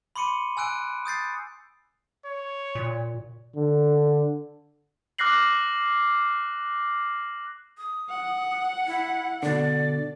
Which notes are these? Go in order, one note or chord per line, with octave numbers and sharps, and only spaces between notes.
B5 C6 D6 C#7 D#7
G#5 E6 F#6 D7
D#6 G6 A6 C7
C#5
A#2
D3
D6 F6 F#6 A#6 C7 F#7
D#6
F#5
E4
B2 D3 D5